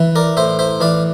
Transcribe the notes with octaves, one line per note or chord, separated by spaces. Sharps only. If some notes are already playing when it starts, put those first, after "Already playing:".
Already playing: E3
A#4 D5
A2 C5 E5
C5 E5
E3 D5 F5